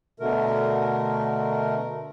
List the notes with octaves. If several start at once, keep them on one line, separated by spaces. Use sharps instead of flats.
B2 D3 A3 A#4